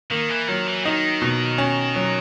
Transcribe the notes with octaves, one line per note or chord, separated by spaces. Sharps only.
D#3 A#3
E3
D#3 F#3
E3
D#3 D#4
B2
C#4
F#3